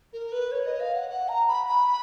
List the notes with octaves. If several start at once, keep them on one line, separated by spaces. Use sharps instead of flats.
A#4
B4
C#5
D#5
F5
F#5
F#5
A#5
B5
B5